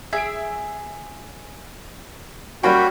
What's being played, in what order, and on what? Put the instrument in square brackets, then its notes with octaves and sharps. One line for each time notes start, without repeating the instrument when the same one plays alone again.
[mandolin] G#4 [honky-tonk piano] E5 D7
[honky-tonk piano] G3 A#3 C#4 [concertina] F#4 [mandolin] G5 B5